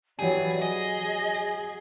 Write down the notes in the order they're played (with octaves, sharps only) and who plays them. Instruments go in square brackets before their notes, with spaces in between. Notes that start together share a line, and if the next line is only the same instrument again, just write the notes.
[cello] E3 [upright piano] F#3 G4 [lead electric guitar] G#4 [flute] D5
[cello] G#4 [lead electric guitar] D#5 [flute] G#5